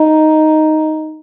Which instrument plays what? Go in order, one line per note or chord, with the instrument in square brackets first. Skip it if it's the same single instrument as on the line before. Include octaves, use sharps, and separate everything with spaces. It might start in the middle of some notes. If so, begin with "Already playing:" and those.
Already playing: [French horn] D#4